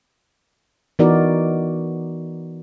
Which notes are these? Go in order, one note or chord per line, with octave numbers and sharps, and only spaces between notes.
E3 B3 D#4 F#4 A#4 D5